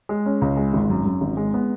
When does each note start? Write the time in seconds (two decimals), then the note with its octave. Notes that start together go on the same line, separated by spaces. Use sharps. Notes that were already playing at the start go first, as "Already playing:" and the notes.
0.09 G#3
0.26 C#4
0.42 C#2
0.57 G#3
0.73 G#1
0.90 F#2
1.06 F#2
1.21 G#1
1.37 G#3
1.54 B3